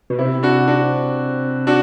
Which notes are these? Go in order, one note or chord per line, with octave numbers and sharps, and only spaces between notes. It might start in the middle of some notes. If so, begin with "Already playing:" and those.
B2
C3 E4
D4 F#4
D4 F#4
D4 F#4